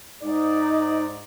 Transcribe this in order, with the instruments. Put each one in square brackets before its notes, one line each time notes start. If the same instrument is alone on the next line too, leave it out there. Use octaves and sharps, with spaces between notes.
[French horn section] G#2 D5 [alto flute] D#4